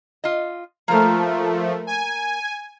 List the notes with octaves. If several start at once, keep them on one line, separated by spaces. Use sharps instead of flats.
F4 D#5
F3 A3 A#3 A#4
G#5